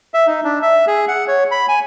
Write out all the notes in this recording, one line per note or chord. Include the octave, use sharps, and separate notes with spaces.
E5
D#4
D4
E5
G#4
F#5
C#5
B5
G#5